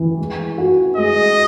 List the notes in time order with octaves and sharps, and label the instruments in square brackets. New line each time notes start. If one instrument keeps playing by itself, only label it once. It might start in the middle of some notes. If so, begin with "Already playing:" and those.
Already playing: [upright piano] E3
G#3
F#4
[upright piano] G#3 [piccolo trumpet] D#5